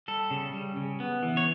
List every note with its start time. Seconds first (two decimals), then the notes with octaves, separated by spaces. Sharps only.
0.08 G3 A4
0.31 C#3
0.53 G3
0.76 C#3
1.00 B3
1.23 E3
1.37 C#5